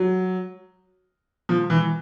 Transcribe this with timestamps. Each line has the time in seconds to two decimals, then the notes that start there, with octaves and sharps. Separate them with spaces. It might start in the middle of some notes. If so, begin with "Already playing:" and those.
Already playing: F#3
1.49 F3
1.70 E3